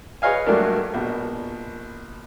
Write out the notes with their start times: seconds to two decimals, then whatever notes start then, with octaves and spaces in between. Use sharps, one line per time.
0.22 G#4 B4 C#5 D#5 F5 G#5
0.46 G2 F#3 A3 A#3 D4 A#4
0.94 A#1 B2